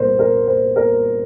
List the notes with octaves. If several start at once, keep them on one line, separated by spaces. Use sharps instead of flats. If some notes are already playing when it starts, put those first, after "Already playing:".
Already playing: C2 A#2 A#3 A#4 C5
A#4
C5
A#4